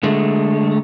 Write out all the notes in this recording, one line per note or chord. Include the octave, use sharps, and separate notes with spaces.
D3 G#3 A3